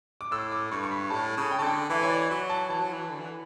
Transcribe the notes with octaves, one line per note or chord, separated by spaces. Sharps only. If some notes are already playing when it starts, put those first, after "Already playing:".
D6
A2 E6
D6
G2 C#6
C#6
B5
A2 A5
C#3
G5
C#3 A5
D3 G5
E3 E5
C#5
D5
F#3 B5
A5
E3 A5
F#3
E3
D3
E3